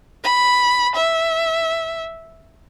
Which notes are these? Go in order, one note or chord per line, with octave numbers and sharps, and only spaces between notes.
B5
E5